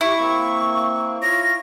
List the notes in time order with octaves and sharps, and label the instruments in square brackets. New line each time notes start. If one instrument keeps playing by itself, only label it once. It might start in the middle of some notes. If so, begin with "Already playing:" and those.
[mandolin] E4 [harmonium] G4 [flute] C#6
[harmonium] A#3 C4
[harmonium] F4 C#5 [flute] A#6